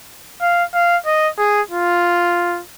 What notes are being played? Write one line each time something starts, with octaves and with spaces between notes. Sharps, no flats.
F5
F5
D#5
G#4
F4